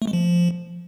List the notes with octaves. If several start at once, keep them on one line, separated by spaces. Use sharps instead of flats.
A3
G#3
F3